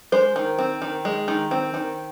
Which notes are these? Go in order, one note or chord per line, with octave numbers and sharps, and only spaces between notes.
G#3 C5
D#3
C4
D#3
G#3
D#3
C4
D#3